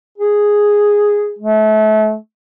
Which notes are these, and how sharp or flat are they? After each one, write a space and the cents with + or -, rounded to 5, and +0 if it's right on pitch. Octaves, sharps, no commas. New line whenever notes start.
G#4 -5
A3 -30